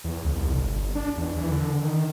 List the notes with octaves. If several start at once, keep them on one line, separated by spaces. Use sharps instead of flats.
E2
C#2
C2
G1
D4
E2
E3
D3
D#3